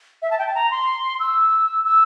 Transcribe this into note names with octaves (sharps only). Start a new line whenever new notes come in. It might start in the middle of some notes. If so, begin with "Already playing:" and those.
E5
A5
G5
A5
A#5
C6
E6
E6